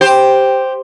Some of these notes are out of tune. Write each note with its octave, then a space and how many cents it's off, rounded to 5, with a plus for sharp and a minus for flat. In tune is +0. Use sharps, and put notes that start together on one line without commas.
G4 +0 C5 +0